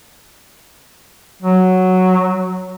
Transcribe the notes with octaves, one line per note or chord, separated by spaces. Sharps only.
F#3